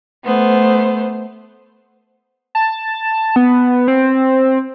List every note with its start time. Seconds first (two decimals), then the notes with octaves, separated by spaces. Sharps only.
0.25 A3 B3 C5
2.55 A5
3.36 B3
3.88 C4